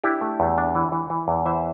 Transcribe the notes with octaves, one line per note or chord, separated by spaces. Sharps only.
D4 E4 G4
A3
E2
D4
E3
E3
E3
E2
E3 C5 E5